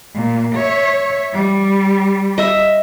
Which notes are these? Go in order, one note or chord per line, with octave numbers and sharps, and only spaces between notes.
A#2
C#5 E5
G3
D#5 E5